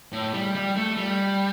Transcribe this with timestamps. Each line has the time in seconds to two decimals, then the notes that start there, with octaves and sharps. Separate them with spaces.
0.12 A2
0.34 G3
0.55 G3
0.76 A3
0.98 G3